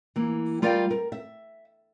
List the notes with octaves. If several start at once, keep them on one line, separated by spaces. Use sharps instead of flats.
E3 A#3
G3 F4 A#4 D5 F5 G5
A#4
E5